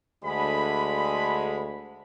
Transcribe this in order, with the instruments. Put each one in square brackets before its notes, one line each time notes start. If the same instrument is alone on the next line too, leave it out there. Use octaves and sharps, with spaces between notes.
[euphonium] D2 [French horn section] D3 G#3 [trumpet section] B5